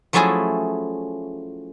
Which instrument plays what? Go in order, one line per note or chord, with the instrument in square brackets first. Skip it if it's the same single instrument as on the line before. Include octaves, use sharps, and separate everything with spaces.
[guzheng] F3 F#3 A3 C#4 E4 G#4